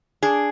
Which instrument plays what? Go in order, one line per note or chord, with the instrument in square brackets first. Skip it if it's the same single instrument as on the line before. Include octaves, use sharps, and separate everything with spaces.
[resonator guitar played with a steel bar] D4 G#4